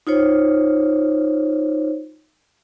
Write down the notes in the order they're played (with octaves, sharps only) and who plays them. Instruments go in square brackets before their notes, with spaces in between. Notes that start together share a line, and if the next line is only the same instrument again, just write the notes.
[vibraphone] D#4 F4 C5 C#5